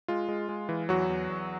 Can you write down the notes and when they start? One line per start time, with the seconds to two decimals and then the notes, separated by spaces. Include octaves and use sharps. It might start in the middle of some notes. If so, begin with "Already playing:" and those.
0.08 G#3 F4
0.29 G#3
0.49 G#3
0.69 E3
0.89 E2 F#3 F#4
1.09 E2
1.29 E2